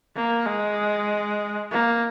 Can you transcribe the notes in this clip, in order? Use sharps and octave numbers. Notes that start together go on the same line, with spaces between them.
A#3
G#3
A#3